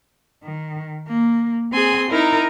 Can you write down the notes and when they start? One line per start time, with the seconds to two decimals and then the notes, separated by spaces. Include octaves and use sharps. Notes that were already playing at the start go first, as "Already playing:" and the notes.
0.43 D#3
1.08 A#3
1.72 C4 G#4 G#5 C6
2.11 D#4 E4 A#4